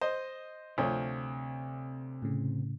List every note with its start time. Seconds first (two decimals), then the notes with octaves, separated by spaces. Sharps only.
0.01 C5 D#5
0.78 D2 C3 F3 C4 C#5
2.22 A2 C#3